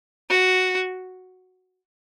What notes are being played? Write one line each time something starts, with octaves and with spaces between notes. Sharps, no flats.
F#4